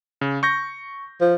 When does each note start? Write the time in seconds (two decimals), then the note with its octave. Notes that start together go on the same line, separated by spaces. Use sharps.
0.21 C#3
0.43 C#6 G6 A#6
1.21 F3